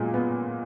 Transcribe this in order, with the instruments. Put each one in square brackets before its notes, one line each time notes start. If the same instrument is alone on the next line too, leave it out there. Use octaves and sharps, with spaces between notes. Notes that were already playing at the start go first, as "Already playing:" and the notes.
Already playing: [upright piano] A#2 F#3 [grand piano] G#3 A#3 B3
[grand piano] B3